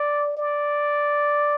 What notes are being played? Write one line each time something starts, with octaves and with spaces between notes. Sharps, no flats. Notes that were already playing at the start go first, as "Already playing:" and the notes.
Already playing: D5
D5